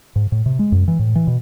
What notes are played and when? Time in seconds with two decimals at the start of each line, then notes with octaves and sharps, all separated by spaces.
0.16 G#2
0.32 A2
0.46 C3
0.59 G#3
0.72 F#2
0.88 E3
0.99 A2
1.15 E3
1.27 B2